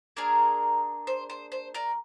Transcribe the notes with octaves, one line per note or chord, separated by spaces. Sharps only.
A#3 D4 G#4 A#4
C5
C5
C5
A#4 D5